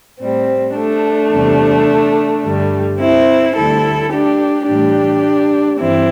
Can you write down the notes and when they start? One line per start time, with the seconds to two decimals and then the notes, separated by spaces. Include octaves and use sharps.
0.20 A2 G3 C4
0.75 A3 D4
1.33 E2 C3 G3
2.44 G2 D3 G3
2.99 C4 E4
3.56 D2 D3 G3 E4 A4
4.13 D4 G4
4.68 A2 E3 G3 D4 G4
5.80 G2 E3 C4 E4